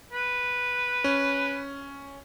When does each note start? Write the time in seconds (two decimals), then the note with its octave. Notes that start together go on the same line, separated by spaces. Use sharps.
0.13 B4
1.04 C#4